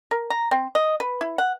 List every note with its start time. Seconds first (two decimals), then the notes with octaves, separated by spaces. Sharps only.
0.11 A#4
0.30 A#5
0.51 C4
0.75 D#5
1.00 B4
1.21 E4
1.38 F#5